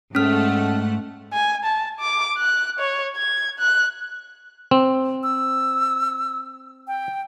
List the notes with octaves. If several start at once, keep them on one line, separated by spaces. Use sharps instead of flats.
G#2 A3 C#4 F#5 F6
G#5
A5
D6
F#6
C#5
G#6
F#6
C4
E6
G5